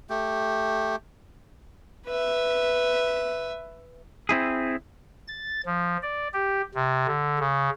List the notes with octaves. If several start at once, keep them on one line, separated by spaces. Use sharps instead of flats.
A3 G4
B4 E5
C4 E4 G#4
A6
F3
D5
G4
C3
D3
C#3